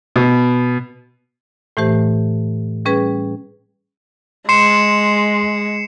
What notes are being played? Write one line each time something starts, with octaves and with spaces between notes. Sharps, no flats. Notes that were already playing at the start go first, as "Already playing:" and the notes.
B2
A2 E3 A3 G4 C5
G3 C#4 G#4 B4
G#3 C6 C7 C#7 E7